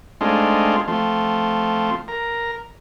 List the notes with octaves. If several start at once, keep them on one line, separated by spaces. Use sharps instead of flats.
G#3 A3 C4 D4 D#4 F4
F3 A3 C4
A#4